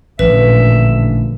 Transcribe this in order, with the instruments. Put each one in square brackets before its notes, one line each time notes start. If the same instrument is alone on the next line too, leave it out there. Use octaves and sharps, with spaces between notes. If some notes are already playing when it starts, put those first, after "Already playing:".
[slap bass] A1 F3 [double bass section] A#2 D3 [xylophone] B4 [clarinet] E5